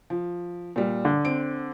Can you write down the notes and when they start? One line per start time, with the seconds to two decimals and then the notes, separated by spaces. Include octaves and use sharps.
0.10 F3
0.76 A#2 G3
1.05 D3
1.25 C4 D7